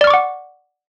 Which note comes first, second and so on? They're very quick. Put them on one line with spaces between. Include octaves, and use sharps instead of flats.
D5 F6 C#6 D6 F#5